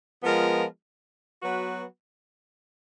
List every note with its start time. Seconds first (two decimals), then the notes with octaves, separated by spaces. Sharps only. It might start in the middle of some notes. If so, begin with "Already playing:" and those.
0.23 F3 G#3 B3 F4 A#4
1.42 F#3 B3 F#4 B4